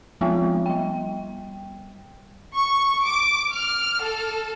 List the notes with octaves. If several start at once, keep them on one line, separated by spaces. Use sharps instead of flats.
F3 G#3 B3 C4 F4
G3 G5
C#6
D6
F6
A4